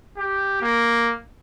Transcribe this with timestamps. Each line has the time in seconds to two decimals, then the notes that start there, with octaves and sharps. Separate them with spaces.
0.17 G4
0.62 A#3